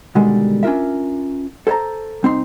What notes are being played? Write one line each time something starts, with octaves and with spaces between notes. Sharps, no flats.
B2 D3 D#3 G3 G#3
C#4 D4 E4 F4 A#4 E5
A4 C5 C#5 A5 A#5
C2 C4 D#4 C6